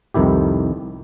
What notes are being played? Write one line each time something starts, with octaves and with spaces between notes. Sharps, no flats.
C2 F2 D#3 E4 G4